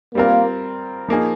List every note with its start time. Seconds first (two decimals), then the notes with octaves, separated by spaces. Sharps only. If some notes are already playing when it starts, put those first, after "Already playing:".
0.15 G3 A#3 C4 F4 A#4
1.08 F3 A#3 D#4 G#4